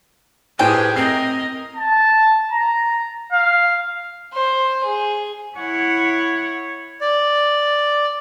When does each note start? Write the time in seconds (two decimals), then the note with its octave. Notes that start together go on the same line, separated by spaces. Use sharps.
0.59 A2 G4 G#4 B4 C5 G5 G#5
0.96 C4 A#4 D#5 G6 C7
1.77 A5
2.52 A#5
3.33 F5
4.33 C5
4.84 G#4
5.56 E4 C#5 F#5
7.01 D5